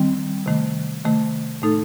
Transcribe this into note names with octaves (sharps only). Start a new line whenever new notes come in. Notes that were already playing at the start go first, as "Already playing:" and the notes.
Already playing: D#3 G3 C4
C3 D#3 A3
C3 D#3 A3
A2 A3 D#4 A4